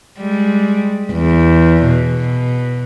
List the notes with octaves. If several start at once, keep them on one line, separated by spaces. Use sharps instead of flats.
G3 G#3
E2
B2